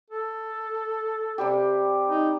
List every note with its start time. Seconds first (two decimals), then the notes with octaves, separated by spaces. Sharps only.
0.10 A4
1.38 C3 G3 G4
2.09 D#4